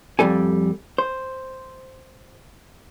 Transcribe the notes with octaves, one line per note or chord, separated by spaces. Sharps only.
F2 G#2 G3 A4 G#5
C5